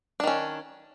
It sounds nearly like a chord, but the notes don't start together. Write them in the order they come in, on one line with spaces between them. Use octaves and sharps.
D4 D#3 C#4